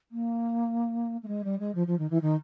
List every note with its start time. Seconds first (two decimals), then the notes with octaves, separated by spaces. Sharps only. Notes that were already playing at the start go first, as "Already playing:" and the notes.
0.12 A#3
1.23 A3
1.28 G#3
1.44 G3
1.60 G#3
1.75 F3
1.87 F3
1.99 D#3
2.10 E3
2.22 D#3